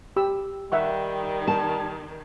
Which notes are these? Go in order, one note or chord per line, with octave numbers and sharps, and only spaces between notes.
G4 B5 E6
D#3 G3 E5 F#5 C#6
A5